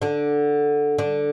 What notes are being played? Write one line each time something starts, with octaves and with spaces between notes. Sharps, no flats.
D3 D4
D3 D4